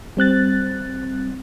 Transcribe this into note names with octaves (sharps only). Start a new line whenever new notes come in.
G3 C4 F#6 A6